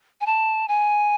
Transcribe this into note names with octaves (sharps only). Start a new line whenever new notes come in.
G#5
A5
G#5